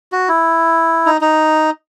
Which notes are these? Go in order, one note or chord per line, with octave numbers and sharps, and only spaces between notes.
F#4
E4
D#4
D#4